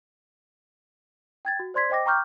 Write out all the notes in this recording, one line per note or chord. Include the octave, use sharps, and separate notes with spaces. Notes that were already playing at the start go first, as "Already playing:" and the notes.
G5 G#6 A6
F#4
C5 D5 C6 G#6 B6
C5 D#5 G5 D6 A#6
G5 A#5 C#6 D6 F6 G6